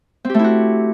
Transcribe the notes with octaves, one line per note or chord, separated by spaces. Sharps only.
A3 C4 E4 F#4 G4